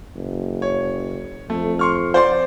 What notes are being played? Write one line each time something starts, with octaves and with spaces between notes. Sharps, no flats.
F#1
C#5
F2 A3
C6 C#6 F6
C5 D5 C6